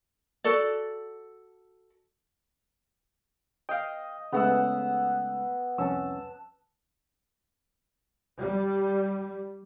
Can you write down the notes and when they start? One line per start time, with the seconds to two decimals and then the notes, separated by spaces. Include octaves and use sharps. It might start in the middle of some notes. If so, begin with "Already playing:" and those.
0.44 F#4 A4 D5
3.69 D#5 F5 G5
4.32 C#3 G#3 A3 B3 F#5 E6
5.78 C2 F2 C#4 A5 E6
8.38 G3